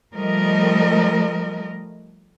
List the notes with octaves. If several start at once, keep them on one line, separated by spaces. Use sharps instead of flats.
F3 G3 A3 A#4 D#5